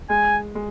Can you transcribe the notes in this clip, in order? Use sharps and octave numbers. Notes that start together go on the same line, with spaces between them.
G#3 G#5
G#3